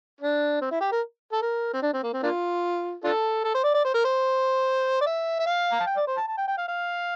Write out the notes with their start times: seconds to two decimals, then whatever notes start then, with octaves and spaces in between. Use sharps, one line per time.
0.21 D4
0.61 C4
0.71 E4
0.81 G4
0.92 A#4
1.33 A4
1.42 A#4
1.73 C4
1.83 D4
1.93 C4
2.03 A#3
2.13 C4
2.23 A#3 D4 F4
3.04 D4 F4 A4
3.44 A4
3.55 C5
3.64 D5
3.74 D5
3.85 C5
3.95 A#4
4.05 C5
5.01 D5
5.06 E5
5.40 E5
5.47 F5
5.72 A#5
5.80 A5
5.87 G5
5.97 D5
6.07 C5
6.17 A5
6.28 A5
6.37 G5
6.47 G5
6.58 F5
6.68 F5